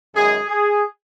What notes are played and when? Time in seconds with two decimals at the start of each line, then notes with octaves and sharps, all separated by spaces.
0.15 F#2 D#3 G#3 G#4
0.49 G#4